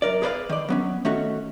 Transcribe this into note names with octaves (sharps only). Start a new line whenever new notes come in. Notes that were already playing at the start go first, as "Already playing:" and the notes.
F#2 A#4 D5
G#4 A4 B4 C5 D5 F5
D#3 D5
F#3 B3 C#4
D#3 A3 C#4 F#4